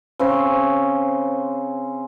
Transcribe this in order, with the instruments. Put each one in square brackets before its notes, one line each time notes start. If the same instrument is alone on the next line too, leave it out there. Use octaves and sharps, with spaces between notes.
[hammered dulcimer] C#3 C4 C5